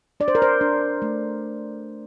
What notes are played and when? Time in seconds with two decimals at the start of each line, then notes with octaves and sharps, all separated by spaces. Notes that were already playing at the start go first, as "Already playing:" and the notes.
0.20 D4 D5
0.28 C5
0.35 A#4
0.42 C5
0.61 D4
1.02 A3